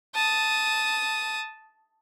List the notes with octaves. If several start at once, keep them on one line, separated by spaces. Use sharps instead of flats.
A5 D#6